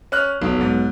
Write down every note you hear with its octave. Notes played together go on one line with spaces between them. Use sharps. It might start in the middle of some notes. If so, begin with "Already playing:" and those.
C#4 F6 F#6
F1 B1
G#2